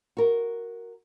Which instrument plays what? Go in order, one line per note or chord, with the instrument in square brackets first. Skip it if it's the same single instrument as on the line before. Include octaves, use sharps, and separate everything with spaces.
[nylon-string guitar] F#4 A#4